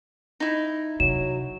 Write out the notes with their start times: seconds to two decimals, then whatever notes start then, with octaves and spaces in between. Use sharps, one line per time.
0.40 D#4 E4
1.00 C3 F#3 E7